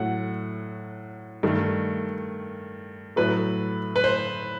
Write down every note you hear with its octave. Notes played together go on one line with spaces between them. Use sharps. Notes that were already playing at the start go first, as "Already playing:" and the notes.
Already playing: A2 F#3 A3 F#5
G2 D#3 A3
A2 F#3 A3 B4
B4
C5